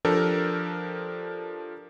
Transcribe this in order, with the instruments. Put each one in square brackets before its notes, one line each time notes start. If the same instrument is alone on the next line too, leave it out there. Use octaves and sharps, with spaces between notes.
[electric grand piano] F3 D4 G4 A4 A#4